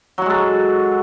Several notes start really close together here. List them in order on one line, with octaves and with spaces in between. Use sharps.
F#3 F#4 G#3 A4